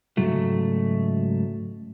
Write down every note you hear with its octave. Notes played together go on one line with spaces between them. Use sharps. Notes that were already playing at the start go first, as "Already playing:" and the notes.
C#2 G#2 F#3 A3